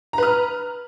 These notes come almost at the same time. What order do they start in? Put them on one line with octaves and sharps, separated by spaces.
A#5 B4 F6